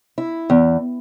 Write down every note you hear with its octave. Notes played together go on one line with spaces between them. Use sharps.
E4
E2